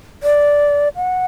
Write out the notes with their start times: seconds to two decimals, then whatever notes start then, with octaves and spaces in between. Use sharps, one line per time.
0.23 D5
0.96 F#5